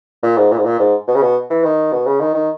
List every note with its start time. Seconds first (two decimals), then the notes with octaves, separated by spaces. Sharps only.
0.23 A#2
0.37 G#2
0.52 A#2
0.59 G#2
0.65 A#2
0.80 G#2
1.08 B2
1.15 C#3
1.22 B2
1.50 E3
1.64 D#3
1.92 B2
2.06 C#3
2.20 D#3
2.34 D#3